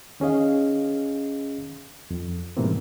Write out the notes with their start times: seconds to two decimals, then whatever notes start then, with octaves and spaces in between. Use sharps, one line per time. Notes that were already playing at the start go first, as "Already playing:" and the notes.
0.20 D#3 C#4 G#4 D#5 F5
2.11 F2
2.57 G#2 B2 E3 G3 A#3 C4